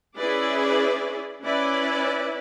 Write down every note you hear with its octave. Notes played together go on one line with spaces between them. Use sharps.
C#4 E4 G#4 B4 D5
C#4 E4 B4 D5